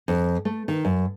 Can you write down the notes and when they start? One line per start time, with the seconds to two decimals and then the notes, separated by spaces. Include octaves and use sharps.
0.08 F2
0.45 A3
0.68 D#3
0.85 F#2